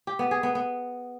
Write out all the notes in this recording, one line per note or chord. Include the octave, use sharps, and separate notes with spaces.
G4
B3
G#4
B3
B3